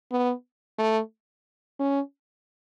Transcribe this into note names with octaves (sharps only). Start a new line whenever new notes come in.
B3
A3
C#4